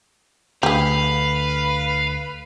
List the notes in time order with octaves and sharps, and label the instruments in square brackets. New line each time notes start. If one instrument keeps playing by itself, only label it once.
[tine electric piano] D2 D3 [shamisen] G4 G#4 [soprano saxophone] B4 [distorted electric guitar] F5